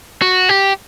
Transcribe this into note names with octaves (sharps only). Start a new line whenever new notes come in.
F#4
G4